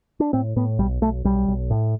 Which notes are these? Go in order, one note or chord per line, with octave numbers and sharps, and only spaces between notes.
D4
A2 C4
A2 B3
B1 G3
B1 A3
B1 G3
B1
A2